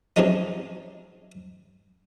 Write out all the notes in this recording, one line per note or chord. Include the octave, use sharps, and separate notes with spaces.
C3 F3 F#3 G#3 C#4 D#4